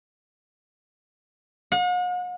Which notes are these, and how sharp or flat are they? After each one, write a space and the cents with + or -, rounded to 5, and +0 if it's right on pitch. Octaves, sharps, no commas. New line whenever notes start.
F#5 -45